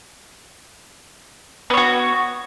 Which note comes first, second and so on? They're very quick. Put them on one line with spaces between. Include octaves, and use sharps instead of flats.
B3 C#5 F#4